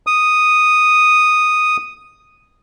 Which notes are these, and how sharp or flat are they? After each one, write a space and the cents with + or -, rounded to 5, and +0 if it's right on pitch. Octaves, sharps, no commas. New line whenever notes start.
D#6 -5